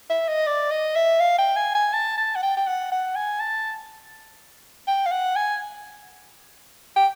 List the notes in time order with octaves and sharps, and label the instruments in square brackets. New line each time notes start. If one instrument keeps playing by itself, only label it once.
[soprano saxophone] E5
D#5
D5
D#5
E5
F5
G5
G#5
G#5
A5
A5
F#5
G5
G5
F#5
F#5
G#5
A5
G5
F5
F#5
G#5
G5